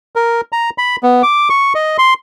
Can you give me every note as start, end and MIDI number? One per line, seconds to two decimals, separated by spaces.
0.16 0.41 70
0.52 0.70 82
0.78 0.96 83
1.03 1.22 59
1.23 1.49 86
1.50 1.73 85
1.75 1.97 75
1.98 2.14 84